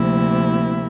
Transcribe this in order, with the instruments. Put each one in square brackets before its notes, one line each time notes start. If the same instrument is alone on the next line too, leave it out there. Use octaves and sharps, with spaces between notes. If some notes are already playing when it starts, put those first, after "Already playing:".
Already playing: [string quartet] D2 C3 F3 A#3 E4